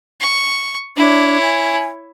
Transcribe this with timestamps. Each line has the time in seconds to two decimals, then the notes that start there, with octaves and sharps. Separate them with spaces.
0.20 C#6
0.97 D4 E4 C#5
1.42 G#5